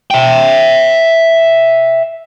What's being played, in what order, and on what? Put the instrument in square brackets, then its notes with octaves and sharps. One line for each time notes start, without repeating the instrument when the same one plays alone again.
[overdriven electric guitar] E5 G5